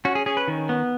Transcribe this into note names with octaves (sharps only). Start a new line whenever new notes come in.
C#4 F#4
G#4
C#4 G#4
B4
D#3
B3